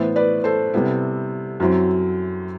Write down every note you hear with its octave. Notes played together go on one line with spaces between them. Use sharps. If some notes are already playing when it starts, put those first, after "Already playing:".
Already playing: A2 E3 B3 C5 E5
B4 D5
A4 C5
C3 G3 B3 E4
F#2 F#3 C4 E4